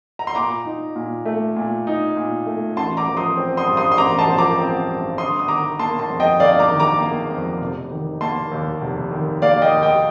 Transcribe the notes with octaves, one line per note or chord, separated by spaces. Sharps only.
A#5
C6
A#2 A#5 D6
D#4
A#2
A3
A#2
D#4
A#2
A3
A1 A5 C6
A#5 D6
F3
C6 D#6
C4
C6 D#6
G2
C6 D#6
C6
A1 A#5 D6
A5 C6
F3
A#5 D6
C4
G2
G1 C6 D#6
D#6
D#3 A#5 D6
A#3 A5 C6
A5 C6
F2
D#5 G5
G1 D5 F5
A#5 D6
D#3
A#5 D6
A#3
F2
F1
D#3
A#3 A5 C6
D#2
F1
D#3
A#3 D5 F5
D#5 G5
D#2
D#5 G5